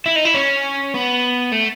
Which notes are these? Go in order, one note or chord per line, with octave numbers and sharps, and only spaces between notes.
E4
D#4
E4
C#4
B3
A3